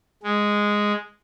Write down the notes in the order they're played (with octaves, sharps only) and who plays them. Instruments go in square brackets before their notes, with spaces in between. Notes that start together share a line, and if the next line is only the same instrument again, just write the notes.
[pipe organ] G#3